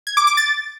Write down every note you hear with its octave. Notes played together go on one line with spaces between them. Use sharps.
G#6
D6
D6
A6